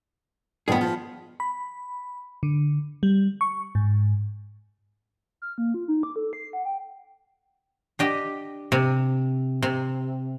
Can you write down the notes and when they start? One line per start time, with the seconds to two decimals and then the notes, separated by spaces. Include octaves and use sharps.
0.68 G2 D#3 F3 B3 G#4
0.81 F3
1.40 B5
2.43 D3
3.03 G3
3.41 C#6
3.75 G#2
5.42 F6
5.58 A#3
5.74 F4
5.88 D#4
6.03 D6
6.16 A4
6.33 C7
6.53 F#5
6.65 G5
7.99 D4 G4 D#5
8.72 C3
9.62 C3